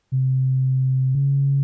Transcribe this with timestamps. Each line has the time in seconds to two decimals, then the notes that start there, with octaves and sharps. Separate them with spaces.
0.12 C3
1.15 C#3